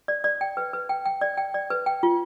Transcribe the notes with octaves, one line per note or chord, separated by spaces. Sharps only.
D5
D5
G5
B4
B4
G5
G5
D5
G5
D5
B4
G5
F4